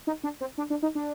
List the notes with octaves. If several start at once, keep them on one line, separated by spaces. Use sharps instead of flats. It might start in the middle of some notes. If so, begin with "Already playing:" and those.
D#4
D4
C4
D4
D4
D#4
D4